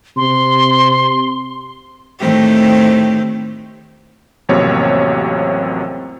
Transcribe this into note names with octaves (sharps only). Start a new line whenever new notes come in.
C3 C6
A2 D#3 A3 C4 G4
A1 F2 C3 F#3 A#3 C#5